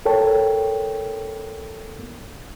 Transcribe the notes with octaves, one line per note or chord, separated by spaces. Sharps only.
A4 A#4 C#5 G5 A5